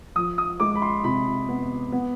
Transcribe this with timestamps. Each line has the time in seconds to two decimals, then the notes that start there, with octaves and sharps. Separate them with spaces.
0.16 F3 D#6
0.38 D#6
0.60 G#3 D6
0.76 B5
0.82 C6
1.04 C3 B5
1.49 B3
1.92 B3